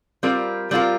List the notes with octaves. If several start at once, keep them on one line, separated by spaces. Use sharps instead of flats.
G3 C4 F4 A#4
G3 C4 F4 A#4